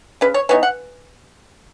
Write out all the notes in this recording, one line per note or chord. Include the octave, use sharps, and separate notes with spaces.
C#3 B4
C#5
E3 B3 D#4 C#5
F#5